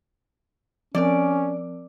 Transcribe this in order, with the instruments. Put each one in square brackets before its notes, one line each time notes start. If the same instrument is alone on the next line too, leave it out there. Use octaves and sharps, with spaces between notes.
[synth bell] F3 C4 A#4 [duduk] C#4 [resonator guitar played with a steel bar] D5